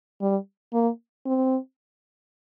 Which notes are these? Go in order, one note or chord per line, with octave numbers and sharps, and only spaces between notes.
G3
A#3
C4